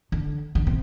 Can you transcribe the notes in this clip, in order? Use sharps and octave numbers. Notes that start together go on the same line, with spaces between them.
D3
D3
C3